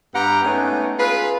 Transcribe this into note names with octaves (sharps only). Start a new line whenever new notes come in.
G2 B3 G4 F#5 A#5
G#3 A3 B3 C#4 D#4
F4 G#4 B4